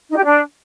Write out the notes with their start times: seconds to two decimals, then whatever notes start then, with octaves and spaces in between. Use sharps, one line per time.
0.10 D#4
0.17 G4
0.24 D4